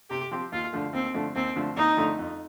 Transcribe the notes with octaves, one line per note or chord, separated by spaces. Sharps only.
C3 G4
F3 C4 G4
D#2 F4
D3 F3 A3
D#2 C4
D3 F3 A3
D#2 C4
D3 F3 A3
D#2 D#4
D3 F3 A3
F2